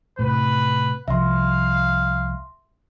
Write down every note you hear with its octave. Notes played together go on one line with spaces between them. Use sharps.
A2 C3 B4
C2 F3 E5 F5 C6